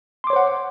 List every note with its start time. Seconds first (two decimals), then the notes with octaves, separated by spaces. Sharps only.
0.24 C6
0.27 D6
0.30 C#5
0.33 C5
0.36 F#5